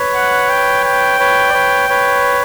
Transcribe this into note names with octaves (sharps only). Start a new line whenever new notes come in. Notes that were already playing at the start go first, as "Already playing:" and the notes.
Already playing: B4 C#5
F#5
G5
G5
B4 C#5
D5
B4 C#5
B4 C#5